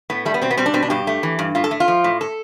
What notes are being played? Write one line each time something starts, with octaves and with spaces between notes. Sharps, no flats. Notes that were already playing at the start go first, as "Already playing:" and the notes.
A2 B3
G3 A3
B3
B2 C4
B3
G3 C4
D4
B2 C4
D4
G2 G4
A3
E3
G2
A2 F4
A4
A3
F4
F3
A2
A4